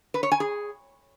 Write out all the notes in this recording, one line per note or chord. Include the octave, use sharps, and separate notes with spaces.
B4
C#5
G#5
G#4